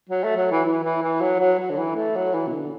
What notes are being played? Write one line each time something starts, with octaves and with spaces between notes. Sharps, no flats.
F#3
A3
F#3
E3
E3
E3
E3
F#3
F#3
F#3
D3
E3
A3
F#3
E3
B2
D3